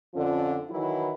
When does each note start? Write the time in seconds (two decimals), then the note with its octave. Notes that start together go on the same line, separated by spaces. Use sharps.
0.14 F2 D3 F3 C#4 D4 F4
0.70 D#3 E3 F#3 E4